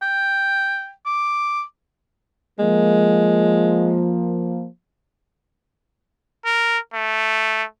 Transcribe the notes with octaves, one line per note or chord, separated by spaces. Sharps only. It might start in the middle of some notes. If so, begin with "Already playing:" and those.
G5
D6
F3 G#3 A#3
A#4
A3